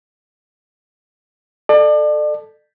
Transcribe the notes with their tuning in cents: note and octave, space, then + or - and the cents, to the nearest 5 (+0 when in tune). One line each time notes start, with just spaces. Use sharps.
A4 +0 D5 +35